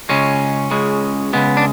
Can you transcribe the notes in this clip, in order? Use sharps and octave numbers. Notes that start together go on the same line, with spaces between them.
C#2 C#3 G#3 C#4
C#2 C#3 G#3
C#2 C#3 G#3 B3
D4